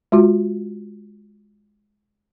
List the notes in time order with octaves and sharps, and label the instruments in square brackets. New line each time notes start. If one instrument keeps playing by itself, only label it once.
[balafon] G#3 F4 F#4